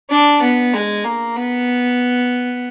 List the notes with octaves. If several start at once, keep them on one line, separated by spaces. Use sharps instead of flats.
D4
B3
G#3
A#3
B3